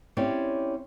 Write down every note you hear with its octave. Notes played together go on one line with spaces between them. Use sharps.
C4 C#4 E4 G4 C#5 D5